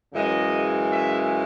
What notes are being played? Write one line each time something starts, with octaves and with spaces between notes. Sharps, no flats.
F#2 C#3 E3 G#3 D#5
E5